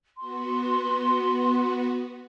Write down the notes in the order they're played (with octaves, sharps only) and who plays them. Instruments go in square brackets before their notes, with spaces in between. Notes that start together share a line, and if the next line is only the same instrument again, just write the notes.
[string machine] B3 F#4 [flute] C6